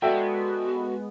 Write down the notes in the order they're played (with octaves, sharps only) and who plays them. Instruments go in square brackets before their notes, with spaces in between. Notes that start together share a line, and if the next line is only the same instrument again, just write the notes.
[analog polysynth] G#3 B3 [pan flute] F#4 [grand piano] A4 D5 F#5 [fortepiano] E5 G5